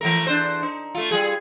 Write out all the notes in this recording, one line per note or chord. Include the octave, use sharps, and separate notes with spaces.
E3 A3 A#4
E2 D4 C5
D#4
A3 F4
G3 F4 G#4